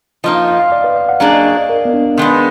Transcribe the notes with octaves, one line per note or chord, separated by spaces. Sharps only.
F3 A#3 D#4 D#5
F5
F5
F5
D5
B4
F5
F#5
F#3 A#3 D4 G#4 F5
D#5
D#5
D5
A#4
B3
D4
D#3 G#3 B3